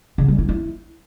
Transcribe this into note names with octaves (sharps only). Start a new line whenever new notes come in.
C#3
G3
E4
E4